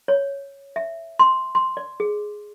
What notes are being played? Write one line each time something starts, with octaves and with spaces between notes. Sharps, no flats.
C#5
E5
C6
C6
D5
G#4